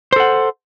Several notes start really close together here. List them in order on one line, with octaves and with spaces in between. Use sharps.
C5 A4 F#5